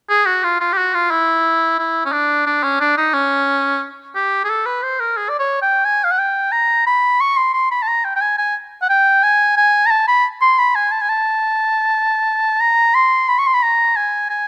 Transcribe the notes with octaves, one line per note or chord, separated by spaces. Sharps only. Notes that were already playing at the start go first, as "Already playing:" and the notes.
G#4
F#4
F4
F4
G4
F#4
F4
E4
E4
C#4
D4
D4
C#4
D4
D#4
C#4
G4
G#4
A4
B4
C5
A#4
G#4
D5
C#5
G5
G#5
F5
F#5
G5
A#5
B5
C#6
C6
C6
B5
A5
A#5
G5
G5
G#5
G#5
F#5
G5
G#5
G#5
A#5
A5
B5
C6
B5
G#5
A5
G#5
A5
A#5
C6
B5
C#6
C6
B5
A#5
G#5
G#5